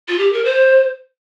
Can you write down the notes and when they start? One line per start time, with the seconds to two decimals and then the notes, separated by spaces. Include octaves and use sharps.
0.08 F4
0.18 G4
0.33 A#4
0.44 C5